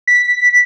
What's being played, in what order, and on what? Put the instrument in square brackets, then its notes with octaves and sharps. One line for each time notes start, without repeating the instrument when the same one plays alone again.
[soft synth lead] B6